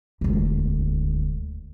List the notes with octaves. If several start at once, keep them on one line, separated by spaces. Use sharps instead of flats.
E1 D2